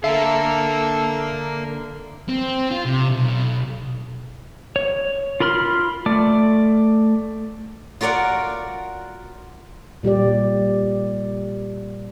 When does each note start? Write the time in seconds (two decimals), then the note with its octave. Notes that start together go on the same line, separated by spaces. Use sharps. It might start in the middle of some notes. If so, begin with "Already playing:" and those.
0.04 D3 A4 A#4 E5 F5
2.29 C4
2.71 F4
2.86 C3
3.09 B1
4.76 C#5
5.40 F4 A#4 B5 C6 F6
6.06 A3 D5
8.01 F4 F#4 A#4 D5 F#5
10.03 A#2 G3 G4 D5